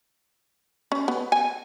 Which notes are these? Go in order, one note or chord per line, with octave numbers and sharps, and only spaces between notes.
C#4
B3
G#5